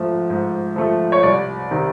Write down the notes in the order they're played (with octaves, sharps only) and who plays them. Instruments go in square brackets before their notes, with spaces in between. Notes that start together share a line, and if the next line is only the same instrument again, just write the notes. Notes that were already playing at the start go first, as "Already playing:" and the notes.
Already playing: [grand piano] G#2 F3 A3
G#2
F3 A3
C#5
C2 D5
C3 D#3